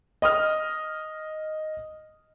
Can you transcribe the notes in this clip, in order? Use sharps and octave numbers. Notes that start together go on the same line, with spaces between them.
D#5 D#6 F6